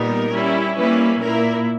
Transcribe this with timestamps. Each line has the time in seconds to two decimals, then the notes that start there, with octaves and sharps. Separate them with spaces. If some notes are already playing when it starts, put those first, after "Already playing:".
Already playing: A#2 G3 B3 D#4 A#4
0.33 G3 C#4 E4
0.77 G3 A#3 C#4 E4 B4
1.22 A#2 A#3 E4 A#4